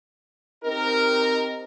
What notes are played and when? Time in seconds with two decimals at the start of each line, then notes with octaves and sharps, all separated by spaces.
0.64 C4 D#4 G4 A#4